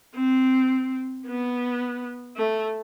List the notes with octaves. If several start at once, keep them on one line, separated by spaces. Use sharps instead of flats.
C4
B3
A3